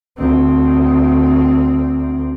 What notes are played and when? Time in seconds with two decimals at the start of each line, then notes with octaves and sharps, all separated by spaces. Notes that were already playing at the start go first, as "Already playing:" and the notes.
0.18 D2 C4